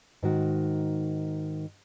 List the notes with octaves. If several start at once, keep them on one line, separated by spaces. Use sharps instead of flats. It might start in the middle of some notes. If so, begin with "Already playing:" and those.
G#2 D#3 F#4